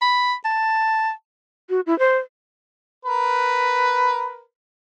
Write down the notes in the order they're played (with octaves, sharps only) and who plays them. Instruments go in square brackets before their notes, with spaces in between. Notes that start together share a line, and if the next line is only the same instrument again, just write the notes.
[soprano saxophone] B5
A5
[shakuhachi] F#4
E4
C5
[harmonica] A#4 B4